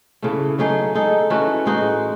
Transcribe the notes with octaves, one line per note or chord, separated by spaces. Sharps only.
C#3 E3 A3
F#3 A3 D#4 G#4
G#3 D#4 A4
E3 A3 C#4 F#4
A2 G#3 D#4 F#4